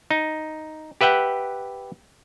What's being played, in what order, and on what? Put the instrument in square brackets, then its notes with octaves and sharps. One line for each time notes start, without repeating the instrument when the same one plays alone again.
[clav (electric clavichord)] D#4
G4 B4 E5 F#5 G5